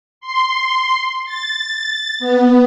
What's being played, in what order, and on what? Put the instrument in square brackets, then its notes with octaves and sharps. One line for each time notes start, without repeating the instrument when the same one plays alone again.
[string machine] C6
A6
B3